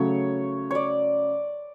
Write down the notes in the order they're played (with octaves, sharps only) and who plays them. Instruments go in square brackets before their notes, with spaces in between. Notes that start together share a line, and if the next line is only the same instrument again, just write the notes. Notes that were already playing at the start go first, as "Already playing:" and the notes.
Already playing: [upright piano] C#3 F#3 A3 [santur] C#5
[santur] C#5 D5